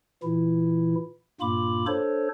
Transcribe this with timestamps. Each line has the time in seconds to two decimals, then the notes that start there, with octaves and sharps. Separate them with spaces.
0.23 A#2 E3 E4
1.41 G2 A#2 A#3 F4 B5 D6
1.87 D4 A4 C5 C#5